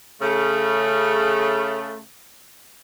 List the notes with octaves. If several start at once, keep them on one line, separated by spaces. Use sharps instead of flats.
C#3 A3